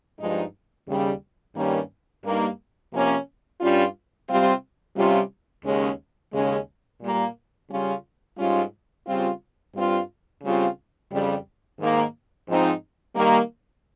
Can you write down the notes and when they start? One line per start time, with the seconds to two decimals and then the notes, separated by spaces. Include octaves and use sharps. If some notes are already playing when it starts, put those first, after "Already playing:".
0.19 G2 F3 G#3 D#4
0.88 D#2 C#3 G3
1.56 G2 D#3 G3 A#3 C#4
2.24 G2 G3 A#3 D#4
2.92 C3 F3 A#3 C#4
3.60 G2 G3 C#4 F4
4.28 C3 G3 C4 F4
4.97 C3 G3 C#4 F4
5.65 D#2 C#3 G#3 C#4
6.33 D#2 C#3 G#3 C#4
7.01 A#2 G3 A#3
7.70 C#3 G3 C#4 F4
8.38 G#2 G3 C#4 F4
9.06 C#3 G3 C4 F4
9.75 G2 G3 C4 F4
10.43 C#3 G3 C4 F4
11.11 F2 C#3 G3
11.79 G#2 D#3 A#3
12.48 G#2 F3 C4 D#4
13.16 D#3 G3 A#3